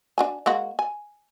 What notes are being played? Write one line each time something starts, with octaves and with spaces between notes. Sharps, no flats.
D4 F#4 G#5
G#3 A#3 F#4
G#5